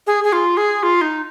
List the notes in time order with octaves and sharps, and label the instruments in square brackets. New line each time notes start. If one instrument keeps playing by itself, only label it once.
[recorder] G#4
G#4
F4
G#4
F4
D#4